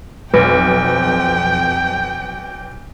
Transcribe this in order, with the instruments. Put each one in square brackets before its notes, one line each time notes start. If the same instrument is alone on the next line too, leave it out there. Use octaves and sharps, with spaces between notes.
[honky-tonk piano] B1 [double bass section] F2 [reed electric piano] B4 [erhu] G5